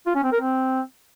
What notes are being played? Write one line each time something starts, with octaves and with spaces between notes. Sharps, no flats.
F4
C#4
C4
A#4
C4